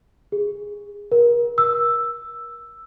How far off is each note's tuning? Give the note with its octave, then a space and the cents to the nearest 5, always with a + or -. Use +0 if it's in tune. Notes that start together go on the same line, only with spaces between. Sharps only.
G#4 -15
A#4 +35
E6 +5